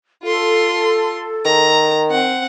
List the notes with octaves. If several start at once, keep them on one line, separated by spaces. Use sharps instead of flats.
F4 A4 C6
D#3 A#5
C4 F#5